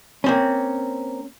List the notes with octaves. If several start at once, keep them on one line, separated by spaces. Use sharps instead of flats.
A#3 C4 C#4